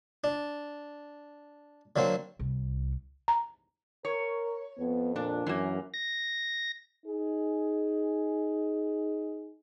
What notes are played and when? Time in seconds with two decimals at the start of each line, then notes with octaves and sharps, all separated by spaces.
0.24 D4
1.96 D3 F#3 A#3 C4
2.39 C2
3.28 A#5
4.05 A#4 C#5
4.79 F2 B3
5.16 A#2 D4
5.46 F#2 E3 A#3
5.94 A#6
7.06 D#4 G#4